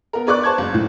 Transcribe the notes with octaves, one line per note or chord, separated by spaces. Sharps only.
B3 A#4
G#4 B4 D5 C#6 D6 F#6
C5 A5 C#6 G#6
F#1
A2